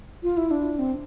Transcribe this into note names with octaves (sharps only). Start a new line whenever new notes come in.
F4
E4
D4
C4